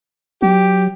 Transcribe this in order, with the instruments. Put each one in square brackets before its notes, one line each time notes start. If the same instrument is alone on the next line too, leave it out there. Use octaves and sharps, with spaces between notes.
[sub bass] F#3 [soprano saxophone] G4